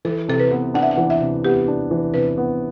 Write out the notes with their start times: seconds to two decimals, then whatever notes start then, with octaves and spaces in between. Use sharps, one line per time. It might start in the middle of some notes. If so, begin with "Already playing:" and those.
0.05 E3 A4
0.28 C3 A4
0.39 B4
0.51 B3
0.74 D4 F#5
0.82 E5
0.91 F#5
0.97 E3
1.10 E5
1.21 C3
1.45 B3 G4
1.68 D4
1.91 E3
2.14 C3 B4
2.38 B3